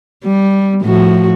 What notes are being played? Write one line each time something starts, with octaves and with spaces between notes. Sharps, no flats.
G3
A2 F3 F#4